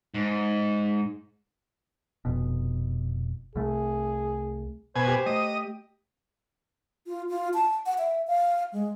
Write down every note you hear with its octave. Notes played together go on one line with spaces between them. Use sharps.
G#2
F1 B2
C2 A3 G#4
B2 C5 G#5
G4
A3 D#5
F4
F4
A5
F#5
E5
F5
G#3